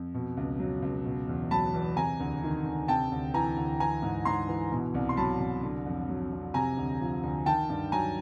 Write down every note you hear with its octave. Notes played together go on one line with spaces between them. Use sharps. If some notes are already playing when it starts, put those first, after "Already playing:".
Already playing: F2
B2
C#2
F#3
C#2
B2
E2
F#3 A5 B5
E2
C3 G#5 A#5
D2
D#3
D2
C3 G5 A5
D2
E3 G#5 A#5
D2
E3 G#5 A#5
G#2
G#2 A#5 C6
E3
B2
C2
C6
F#3 A5 B5
C2
D3
F2
F#3
F2
C3 G#5 A#5
D2
F3
D2
D#3 G5 A5
G2
F#3 G#5 A#5